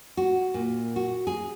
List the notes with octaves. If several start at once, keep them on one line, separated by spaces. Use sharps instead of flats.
F#4
A#2
F#4
G#4